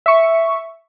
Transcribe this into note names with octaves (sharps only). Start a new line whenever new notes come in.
E5 C#6